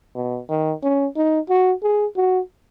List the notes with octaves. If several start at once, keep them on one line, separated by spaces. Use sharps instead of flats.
B2
D#3
C#4
D#4
F#4
G#4
F#4